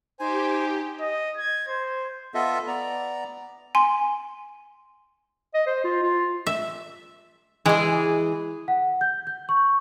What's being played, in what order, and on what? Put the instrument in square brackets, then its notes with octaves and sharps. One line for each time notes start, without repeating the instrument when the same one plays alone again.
[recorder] D#4 [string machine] G4 [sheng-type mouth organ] C5 G#5
[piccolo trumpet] D#5
G#6
C5
[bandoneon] B3 F4 A4 D#5 E5
B3 D5 A#5
[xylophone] G#5 C6
[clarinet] D#5
C5
F4
F4
[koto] E5
[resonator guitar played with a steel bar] E3 G#4 [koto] G#3
[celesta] F#5
G6
G6
C#6